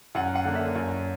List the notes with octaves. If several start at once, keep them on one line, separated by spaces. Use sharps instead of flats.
F#2 F#5
F#5
D3 A#3 D4
E5
F#2